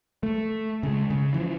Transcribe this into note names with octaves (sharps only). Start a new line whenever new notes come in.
A3
C#3 G#3
C#3
E3 F3